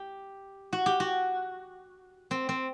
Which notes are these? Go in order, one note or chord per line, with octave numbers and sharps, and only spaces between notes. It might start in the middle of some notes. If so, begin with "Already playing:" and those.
Already playing: G4
F#4
G4
F#4
C4
C4